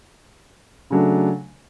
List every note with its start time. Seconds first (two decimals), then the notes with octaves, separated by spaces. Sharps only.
0.90 C#3 F#3 A3 D4